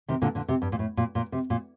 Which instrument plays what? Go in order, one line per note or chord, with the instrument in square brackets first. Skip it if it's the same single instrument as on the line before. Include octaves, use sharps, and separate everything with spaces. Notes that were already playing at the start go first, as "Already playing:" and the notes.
[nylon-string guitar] C3 D#3
A#2 D3
A#2 D3
C3
G2
A#2
A2
A#2
A#2
C3
A#2